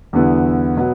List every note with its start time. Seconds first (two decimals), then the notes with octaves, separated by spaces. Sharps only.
0.13 E2 D3 G3 B3 E4
0.76 B2 F#3 B3